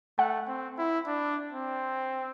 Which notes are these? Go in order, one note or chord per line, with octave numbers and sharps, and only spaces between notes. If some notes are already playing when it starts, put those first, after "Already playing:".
A3 F#5
C4
E4
D4
C4